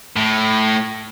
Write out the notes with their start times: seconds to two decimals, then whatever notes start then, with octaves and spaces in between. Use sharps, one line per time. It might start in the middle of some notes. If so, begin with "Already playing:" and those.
0.16 A2